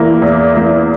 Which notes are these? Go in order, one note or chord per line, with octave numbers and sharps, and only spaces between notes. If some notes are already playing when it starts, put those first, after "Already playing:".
Already playing: E2 E3 A#3 E4
E2
E3 A#3 E4